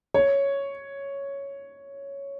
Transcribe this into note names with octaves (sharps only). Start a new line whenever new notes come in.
C#5